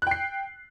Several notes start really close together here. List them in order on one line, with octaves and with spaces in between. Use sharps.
F#6 G5 C7